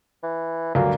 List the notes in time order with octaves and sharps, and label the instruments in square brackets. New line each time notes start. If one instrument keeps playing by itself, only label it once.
[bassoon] E3
[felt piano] D2 G2 F#3 [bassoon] A#3